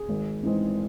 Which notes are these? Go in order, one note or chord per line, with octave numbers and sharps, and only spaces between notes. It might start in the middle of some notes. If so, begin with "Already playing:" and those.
Already playing: G#4
G#1
G#2 E3 G#3 C4